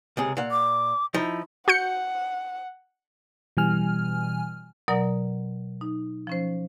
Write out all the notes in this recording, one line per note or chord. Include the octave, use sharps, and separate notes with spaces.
C#2 C3 G#4
A#2 F5 F#5
D6
F3 D#4 E4
F#4 F#5 G6 C#7
B2 E3 G3 G#5 F6
B2 F#3 A#4 D5 F#5 A#5
D#4
F3 C#4 C5